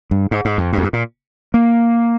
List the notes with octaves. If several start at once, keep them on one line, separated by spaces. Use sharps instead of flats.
G2
G#2
G#2
F2
G2
F2
G2
A#2
A#3